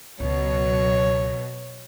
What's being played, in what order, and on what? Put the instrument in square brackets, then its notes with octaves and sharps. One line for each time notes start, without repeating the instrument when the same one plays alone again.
[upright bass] C#2 [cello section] B2 F#3 [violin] C#5